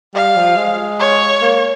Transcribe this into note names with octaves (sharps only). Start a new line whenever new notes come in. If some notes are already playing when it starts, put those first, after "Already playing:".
G3 F5
F3
G#3
C#5
A#3